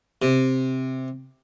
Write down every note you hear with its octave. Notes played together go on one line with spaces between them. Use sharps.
C3